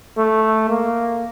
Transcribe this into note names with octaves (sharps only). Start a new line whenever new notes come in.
A3
A#3